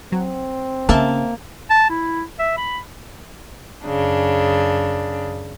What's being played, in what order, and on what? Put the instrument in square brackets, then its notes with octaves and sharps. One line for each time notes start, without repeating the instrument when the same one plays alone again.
[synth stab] F#3 [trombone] C4
[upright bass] C#3 [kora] A#3 [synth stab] E5 A5
[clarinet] A5
E4
E5
B5
[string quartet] F#2 C#3 D4